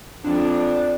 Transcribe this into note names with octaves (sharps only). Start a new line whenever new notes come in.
F2 D4